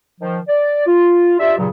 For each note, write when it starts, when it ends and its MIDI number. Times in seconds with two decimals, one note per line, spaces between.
0.21 0.39 51
0.21 0.39 53
0.49 0.84 74
0.86 1.35 65
1.40 1.55 62
1.40 1.55 65
1.40 1.55 67
1.40 1.55 76
1.58 1.68 43
1.58 1.68 46
1.58 1.68 49
1.58 1.68 54